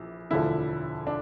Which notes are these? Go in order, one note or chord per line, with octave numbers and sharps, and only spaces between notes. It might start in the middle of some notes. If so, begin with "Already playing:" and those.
Already playing: A#1 E3
E1 D2 D3 F3 E4
D4